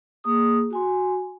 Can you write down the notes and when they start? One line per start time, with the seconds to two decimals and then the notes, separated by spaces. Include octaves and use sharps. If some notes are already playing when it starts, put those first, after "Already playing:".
0.24 A#3 G#4 D#6
0.71 F#4 G#5 C6